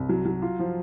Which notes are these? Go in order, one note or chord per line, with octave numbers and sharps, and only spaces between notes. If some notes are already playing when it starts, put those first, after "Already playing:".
Already playing: C2
F#3
F#3
F4
F3